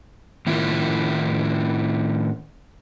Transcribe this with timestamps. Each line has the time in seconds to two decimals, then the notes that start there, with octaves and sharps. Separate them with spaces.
0.47 A2 D#3 E4 F4